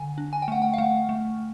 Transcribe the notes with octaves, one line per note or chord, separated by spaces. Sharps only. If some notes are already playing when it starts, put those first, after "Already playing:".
Already playing: D3 G#5
D4
G#5
G5
A3 F#5
G5
F5
A3 F#5
A3